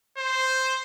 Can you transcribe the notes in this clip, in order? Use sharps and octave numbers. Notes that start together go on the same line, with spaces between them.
C5